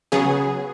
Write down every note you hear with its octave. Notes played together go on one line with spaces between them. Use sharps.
C#3 F#3 B3 G#4